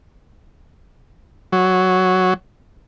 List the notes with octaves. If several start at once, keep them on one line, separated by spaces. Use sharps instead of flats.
F#3